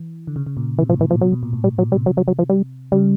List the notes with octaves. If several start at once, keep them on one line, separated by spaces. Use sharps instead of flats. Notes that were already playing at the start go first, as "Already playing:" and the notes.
Already playing: E3
D3
C#3
C#3
A#2
C3 E3
A2 F3
A2 E3
A#2 F3
B2 F#3
B2
A#2
A2
G3
A#2 F#3
C3 G3
F#3
F#3
F#3
F3
G3
C#3 G3